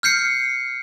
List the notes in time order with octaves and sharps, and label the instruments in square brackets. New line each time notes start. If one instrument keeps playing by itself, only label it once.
[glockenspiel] F6 G6 C7 C#7